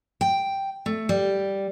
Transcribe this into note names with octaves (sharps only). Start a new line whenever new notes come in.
G5
A3
G3